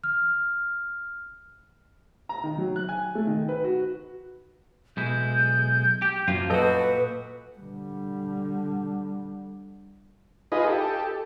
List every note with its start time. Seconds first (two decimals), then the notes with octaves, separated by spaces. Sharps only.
0.04 F6
2.29 A#5
2.44 D#3
2.58 F#3
2.76 F#6
2.89 G#5
3.15 A3
3.27 D#3
3.49 B4
3.64 F#4
4.97 B1 G#3 E4 G6
6.02 G4
6.28 F#2 F3 A#3 F4
6.50 A#2 F#4 A4 B4 D#5 G6
7.58 D3 G3
10.52 D#4 F4 G#4 B4 D#5
10.67 G4 A4